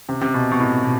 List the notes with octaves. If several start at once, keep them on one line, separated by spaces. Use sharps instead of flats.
C3
C3
B2
B2
A2
B2